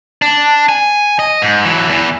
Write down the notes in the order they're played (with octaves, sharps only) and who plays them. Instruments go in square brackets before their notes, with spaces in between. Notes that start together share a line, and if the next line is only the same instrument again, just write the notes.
[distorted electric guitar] D4
G#5
D#5
G#2
E3 F#3
E2 E3